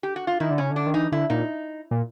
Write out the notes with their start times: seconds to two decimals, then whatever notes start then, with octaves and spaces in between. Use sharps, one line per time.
0.03 G4
0.16 F#4
0.27 F4
0.40 D#3 E4
0.51 D3
0.58 C#3 C#4
0.71 D3
0.76 D4
0.87 D#3
0.94 E3 D#4
1.12 D3 E4
1.30 A#2 D#4
1.91 A#2